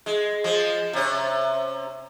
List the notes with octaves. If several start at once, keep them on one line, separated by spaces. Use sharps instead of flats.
G#3
F3 G#3
C3 C#4